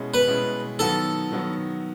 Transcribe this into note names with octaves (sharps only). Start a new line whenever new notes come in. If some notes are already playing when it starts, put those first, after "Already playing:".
Already playing: B2 G#3 C#4 E4
B4
B2 G#3 C#4 E4
D#3 F#3 B3 A4
D#3 F#3 B3